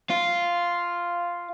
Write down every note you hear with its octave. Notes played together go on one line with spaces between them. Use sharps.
F4